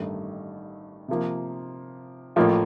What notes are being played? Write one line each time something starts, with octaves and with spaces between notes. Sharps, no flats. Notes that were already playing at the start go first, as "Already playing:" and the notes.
Already playing: A1 G2 D#3 A3 D#4
C3 F3 A#3
A1 A2 F3 A#3 F4